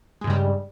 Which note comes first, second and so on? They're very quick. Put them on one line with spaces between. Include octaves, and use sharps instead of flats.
G#3 G2 C#3 G3